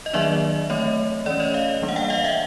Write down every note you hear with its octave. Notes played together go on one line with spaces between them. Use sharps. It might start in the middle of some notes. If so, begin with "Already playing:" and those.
D#5
D#3 F#3 A#3 D4 D5 E5
E3 A3 C4 C#5 D#5
E3 A3 C#4 D5
C#5 D#5
D#5 F5
E3 G3 A#3 D4
F#5
F5 G5
D#5 F5
E5 F#5